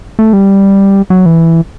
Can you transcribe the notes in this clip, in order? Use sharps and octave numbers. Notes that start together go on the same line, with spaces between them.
A3
G3
F#3
E3